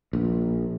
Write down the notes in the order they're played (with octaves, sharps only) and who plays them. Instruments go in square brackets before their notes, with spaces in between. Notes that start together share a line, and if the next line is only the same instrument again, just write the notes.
[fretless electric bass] A#1